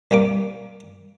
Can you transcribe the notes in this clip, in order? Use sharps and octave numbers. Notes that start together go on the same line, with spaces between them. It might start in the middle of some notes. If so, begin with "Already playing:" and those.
C2 G3 A#3 D6